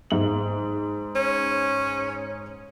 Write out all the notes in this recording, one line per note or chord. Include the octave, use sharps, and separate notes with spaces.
G#2 F#7
C#4